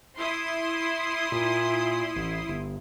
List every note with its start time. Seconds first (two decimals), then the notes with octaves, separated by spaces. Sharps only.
0.17 E4 C6 D#6
1.32 A#2
2.16 A1
2.49 G1